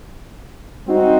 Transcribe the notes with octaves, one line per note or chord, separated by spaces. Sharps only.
G3 C4 D#4 F#4